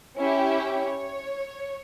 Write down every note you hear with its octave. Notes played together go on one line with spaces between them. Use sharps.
C#4 E4 G4
C#5